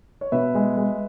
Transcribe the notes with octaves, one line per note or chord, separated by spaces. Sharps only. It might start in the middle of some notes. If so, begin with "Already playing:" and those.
C#5
B2 B4 E5
G#3
G#3